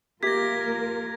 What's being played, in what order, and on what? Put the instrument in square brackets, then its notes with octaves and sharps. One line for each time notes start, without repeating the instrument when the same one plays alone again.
[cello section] A#3 F4 A#4 [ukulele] G4 E5 [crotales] G#6 A#6 [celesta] B6